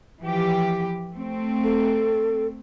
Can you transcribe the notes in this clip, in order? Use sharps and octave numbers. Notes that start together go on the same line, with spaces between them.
E3 F3 G4
A3 C4
A4